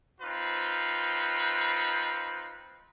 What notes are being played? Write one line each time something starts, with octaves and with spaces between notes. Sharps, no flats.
C4 D#4 F4 B4